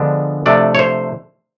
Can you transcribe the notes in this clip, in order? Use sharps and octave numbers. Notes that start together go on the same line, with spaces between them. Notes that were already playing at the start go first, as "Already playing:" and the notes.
Already playing: D3 F3 G#3 B3 D4
C3 F3 A3 D4 D5
C#5
C5